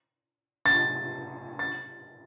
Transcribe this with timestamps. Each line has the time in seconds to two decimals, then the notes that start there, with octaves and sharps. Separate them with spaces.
0.66 A6
1.59 A6